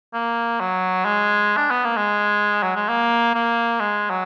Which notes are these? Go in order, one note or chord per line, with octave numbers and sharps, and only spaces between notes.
A#3
F#3
G#3
D4
B3
A#3
G#3
F#3
G#3
A#3
A#3
G#3
F#3